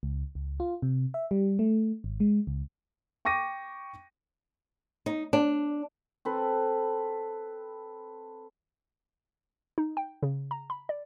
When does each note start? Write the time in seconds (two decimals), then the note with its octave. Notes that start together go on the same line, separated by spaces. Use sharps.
0.03 C#2
0.35 C#2
0.60 F4
0.82 C3
1.14 E5
1.31 G3
1.59 A3
2.04 G#1
2.20 G#3
2.47 C#2
3.25 G5 C#6 D6 A#6 D#7
5.06 D#4
5.33 D4
6.25 C4 A4 B4
9.78 D#4
9.97 G5
10.23 C#3
10.51 A#5
10.70 B5
10.89 D5